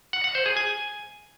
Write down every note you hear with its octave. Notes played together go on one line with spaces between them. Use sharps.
F#5
F#5
C5
G#4
G#5